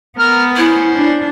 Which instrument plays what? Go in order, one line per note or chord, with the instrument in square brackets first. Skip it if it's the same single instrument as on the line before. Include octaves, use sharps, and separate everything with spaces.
[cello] B3 [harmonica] A#4 F6
[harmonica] C#4 C5 [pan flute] E4
[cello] D4